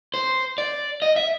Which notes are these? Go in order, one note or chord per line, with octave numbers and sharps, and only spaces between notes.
C5
D5
D#5
E5